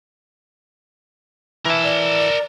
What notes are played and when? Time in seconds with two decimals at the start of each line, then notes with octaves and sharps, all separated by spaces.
1.66 E3 E4 A#4 A5
1.84 D5